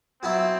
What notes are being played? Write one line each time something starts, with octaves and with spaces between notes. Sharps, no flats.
F#3 B3 C4 E4